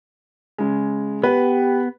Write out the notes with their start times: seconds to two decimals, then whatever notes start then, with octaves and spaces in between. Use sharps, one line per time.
0.58 C#3 G#3
1.24 B3 G4 B4